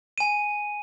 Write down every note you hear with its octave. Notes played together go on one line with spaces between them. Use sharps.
G#5 D#7